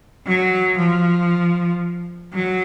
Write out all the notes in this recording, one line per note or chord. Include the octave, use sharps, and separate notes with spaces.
F#3
F3
F#3